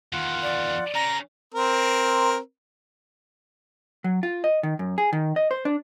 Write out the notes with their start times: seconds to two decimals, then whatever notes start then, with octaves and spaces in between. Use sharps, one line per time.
0.13 E2 D#3 F4 F#5
0.42 D5
0.95 C#3 A#5
1.54 C4 A#4
4.04 F#3
4.23 F4
4.44 D#5
4.63 D#3
4.79 F#2
4.98 G#4
5.13 D#3
5.36 D#5
5.51 C5
5.65 D4